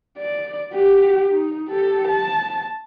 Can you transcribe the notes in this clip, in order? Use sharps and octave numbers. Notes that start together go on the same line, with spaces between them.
D5
F#4 G4
D#4
G4 A4
A5